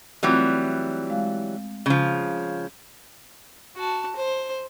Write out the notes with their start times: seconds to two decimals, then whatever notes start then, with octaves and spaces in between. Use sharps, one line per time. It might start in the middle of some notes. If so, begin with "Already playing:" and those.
0.23 E3 F#3 G3 A3 C4 F4
1.10 G#3 F5
1.86 C#3 F3
3.77 F#4 A5
4.16 C5